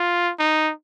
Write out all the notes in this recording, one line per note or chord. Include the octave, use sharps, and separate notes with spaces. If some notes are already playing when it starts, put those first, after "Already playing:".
Already playing: F4
D#4